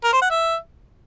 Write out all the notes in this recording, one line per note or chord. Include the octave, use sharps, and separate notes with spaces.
A#4
C5
F#5
E5